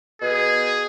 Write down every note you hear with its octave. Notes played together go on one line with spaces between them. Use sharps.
B2 G#4